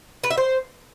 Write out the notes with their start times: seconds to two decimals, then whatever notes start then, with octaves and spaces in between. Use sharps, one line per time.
0.24 B4
0.31 E5
0.38 C5